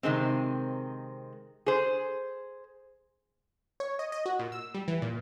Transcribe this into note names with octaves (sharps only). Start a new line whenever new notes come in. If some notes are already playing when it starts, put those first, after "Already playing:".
C3 D#3 G#3 C4
G#4 C5
C#5
D#5
D#5
F#4
A#2
E6
G3
E3
A#2